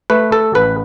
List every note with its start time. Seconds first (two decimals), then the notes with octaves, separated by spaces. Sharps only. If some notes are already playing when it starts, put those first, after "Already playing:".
0.10 A3 B4
0.32 A4
0.55 A1 B4